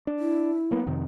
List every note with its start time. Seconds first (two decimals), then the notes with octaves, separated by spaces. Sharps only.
0.07 D4
0.19 E4
0.71 F#3 A#3 B3
0.87 F2 C3 D#3